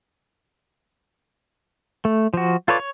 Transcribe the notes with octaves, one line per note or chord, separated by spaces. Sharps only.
A3
F3 F#4
F4 A4 B4 C#5 D5
C#5